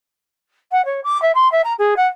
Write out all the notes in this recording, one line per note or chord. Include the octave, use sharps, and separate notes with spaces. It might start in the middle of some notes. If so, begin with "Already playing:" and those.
F#5
C#5
D6
E5
C6
E5
A#5
G#4
F#5